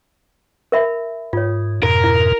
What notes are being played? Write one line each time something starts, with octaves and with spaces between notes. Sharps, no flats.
A#4 E5 B5
G#2 F4 C#5
F2 G#2 B2 A#4
E4